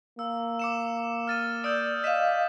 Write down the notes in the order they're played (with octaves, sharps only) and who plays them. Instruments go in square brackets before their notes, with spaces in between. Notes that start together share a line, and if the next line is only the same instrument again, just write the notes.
[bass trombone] A#3 [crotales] E6
[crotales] D6 C#7 E7
F6 A6 D#7
[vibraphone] D5 [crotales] D#6 E6 G6
[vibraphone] D#5 F5 [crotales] B6 E7